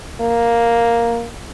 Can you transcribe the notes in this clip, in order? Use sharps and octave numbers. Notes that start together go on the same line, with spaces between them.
A#3